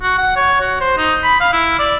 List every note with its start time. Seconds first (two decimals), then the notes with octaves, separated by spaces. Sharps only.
0.02 F#4
0.18 F#5
0.36 C#5
0.61 F#4
0.81 C5
0.98 D#4
1.24 B5
1.40 F5
1.53 E4
1.79 D5